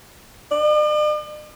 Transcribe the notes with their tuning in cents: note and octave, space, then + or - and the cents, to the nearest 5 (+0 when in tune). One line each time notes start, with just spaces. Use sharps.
D5 +45